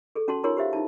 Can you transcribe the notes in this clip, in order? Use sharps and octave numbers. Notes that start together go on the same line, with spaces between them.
G#4 A4
C#4 F#4 A5 C6
D#4 F4 G#4 A#4 C#5 C6
G4 C5 E5 F5
D#4 E4 A5